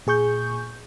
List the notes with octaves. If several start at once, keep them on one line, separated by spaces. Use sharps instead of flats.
A#2 G#4 C#6 G6